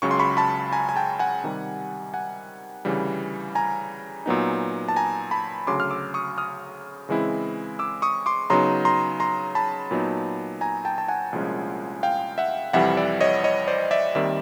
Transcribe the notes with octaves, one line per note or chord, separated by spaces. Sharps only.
C#2 C#3 F#3 C#6
C6
B5 C#6
A5 B5
G#5 A#5
G#5
G5 A5
F#5 G#5
C3 D#3 G3
F#5 G#5
D2 C#3 E3 G3
G#5 A#5
A#2 F#3 B3 D#4
A5
G#5 A#5
A5 B5
D2 C#3 F#3 C6 D6
F6
D6 E6
C#6 D#6
D#6 F6
C#3 E3 G#3 C4 E4
D6 E6
C#6 D#6
C6 D6
C#3 F#3 B3 D#4 A#5 C6
A#5 C6
A#5 C6
A5 B5
A#2 F#3 B3 D#4
G#5 A#5
G5 A5
A5
F#5 G#5
C2 A#2 F3 G#3 C#4
F5 G5
E5 F#5
F2 C3 E3 G3 E5 F#5
D5 E5
C#5 D#5
C#5 D#5
C5 D5
D5 E5
D#2 D#3 G3 C4 D5 E5